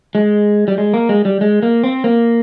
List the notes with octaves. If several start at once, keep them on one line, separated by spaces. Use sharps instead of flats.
G#3
G3
G#3
A#3
G#3
G3
G#3
A#3
C4
A#3